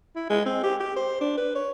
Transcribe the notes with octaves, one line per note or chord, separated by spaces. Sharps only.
E4
G#3
C4
G4
G4
C5
D4
B4
C#5